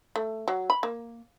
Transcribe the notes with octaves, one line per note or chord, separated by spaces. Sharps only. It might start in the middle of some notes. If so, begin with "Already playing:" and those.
A3
F#3
B5
A#3